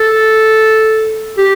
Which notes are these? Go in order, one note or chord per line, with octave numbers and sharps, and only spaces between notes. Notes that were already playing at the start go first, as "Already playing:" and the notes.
Already playing: A4
G4